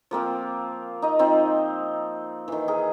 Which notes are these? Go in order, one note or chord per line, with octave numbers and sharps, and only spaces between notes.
F3 A#3 C4 F4
D#4 D#5
F3 C4 D#4
D#3 E3
G#4 A#4